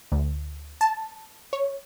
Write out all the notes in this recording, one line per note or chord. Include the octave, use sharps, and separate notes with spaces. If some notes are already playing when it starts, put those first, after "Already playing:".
D2
A5
C#5